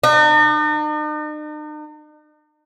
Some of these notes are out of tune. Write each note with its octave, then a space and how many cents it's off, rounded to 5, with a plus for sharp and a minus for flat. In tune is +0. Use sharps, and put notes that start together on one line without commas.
D#4 -45